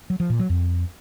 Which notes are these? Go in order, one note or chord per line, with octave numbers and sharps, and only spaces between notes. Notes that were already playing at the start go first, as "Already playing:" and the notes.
F#3
F3
A#2
F#3
F2